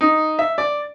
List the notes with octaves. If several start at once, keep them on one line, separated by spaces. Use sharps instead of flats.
D#4
E5
D5